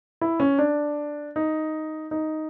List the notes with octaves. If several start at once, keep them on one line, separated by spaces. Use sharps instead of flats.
E4
C#4
D4
D#4
D#4